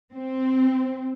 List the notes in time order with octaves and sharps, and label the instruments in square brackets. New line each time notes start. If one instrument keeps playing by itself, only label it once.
[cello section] C4